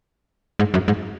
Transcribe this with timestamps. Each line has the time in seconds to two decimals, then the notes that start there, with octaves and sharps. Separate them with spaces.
0.59 G#2
0.74 F#2
0.88 G#2